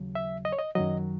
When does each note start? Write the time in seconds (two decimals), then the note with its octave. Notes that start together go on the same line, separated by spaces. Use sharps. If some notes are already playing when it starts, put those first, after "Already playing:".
Already playing: D#2 C#3 F#3
0.15 E5
0.45 D#5
0.52 C#5
0.59 D#5
0.75 F#2 D#3 F#3 D#5